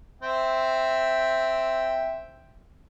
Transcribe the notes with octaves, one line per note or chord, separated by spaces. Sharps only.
C4 E5 G5